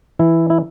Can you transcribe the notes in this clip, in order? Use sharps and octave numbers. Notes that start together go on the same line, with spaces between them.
E3 E4
E4